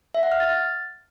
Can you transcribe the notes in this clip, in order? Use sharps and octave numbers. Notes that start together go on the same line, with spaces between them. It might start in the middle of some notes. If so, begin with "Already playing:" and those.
E5
F#5
F6
A6